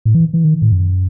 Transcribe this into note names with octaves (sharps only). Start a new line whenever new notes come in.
A2
E3
E3
D#3
A2
F#2